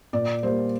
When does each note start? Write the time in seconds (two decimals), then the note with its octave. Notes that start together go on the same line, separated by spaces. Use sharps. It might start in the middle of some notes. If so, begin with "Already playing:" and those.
0.13 A#2 D5
0.43 G3 A#3 C5